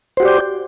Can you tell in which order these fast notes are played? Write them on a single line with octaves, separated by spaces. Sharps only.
C5 F#4 G4 D5 G5